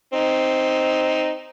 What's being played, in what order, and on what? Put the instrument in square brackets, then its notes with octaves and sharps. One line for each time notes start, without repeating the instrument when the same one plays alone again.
[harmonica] C4 D#4